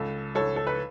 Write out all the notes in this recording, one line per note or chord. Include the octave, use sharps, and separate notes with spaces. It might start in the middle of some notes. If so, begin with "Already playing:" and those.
Already playing: C#2 A4
C#2 A4 C#5
A4
B4